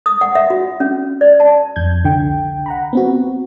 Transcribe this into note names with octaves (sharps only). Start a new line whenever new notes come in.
D#6
F#5
E5
F#4
C#4
D5
A5
F2 G6 G#6
C2 D3 G5
F#5 A#5 B5
B3 C4 F#4